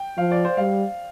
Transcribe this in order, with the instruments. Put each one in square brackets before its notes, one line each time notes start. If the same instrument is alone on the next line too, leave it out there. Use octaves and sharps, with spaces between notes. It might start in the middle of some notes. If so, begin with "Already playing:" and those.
Already playing: [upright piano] G5
[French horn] F3 [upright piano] F5
[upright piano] D5
C5
[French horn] G3 [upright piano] F5